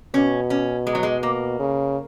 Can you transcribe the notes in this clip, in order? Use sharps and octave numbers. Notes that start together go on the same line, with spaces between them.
B2 C#4
C#4
G#3
F#3
G#3
A#3
C#3